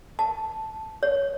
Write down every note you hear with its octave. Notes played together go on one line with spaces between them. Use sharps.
A5
C#5